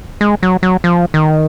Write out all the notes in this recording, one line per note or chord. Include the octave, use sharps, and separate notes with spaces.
G#3
F#3
F#3
F3
D#3